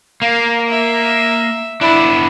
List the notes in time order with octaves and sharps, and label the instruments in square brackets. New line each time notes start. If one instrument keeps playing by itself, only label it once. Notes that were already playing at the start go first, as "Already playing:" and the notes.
[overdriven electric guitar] A#3 [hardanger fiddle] F5
[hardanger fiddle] E5
[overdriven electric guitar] B3 D4 [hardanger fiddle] E4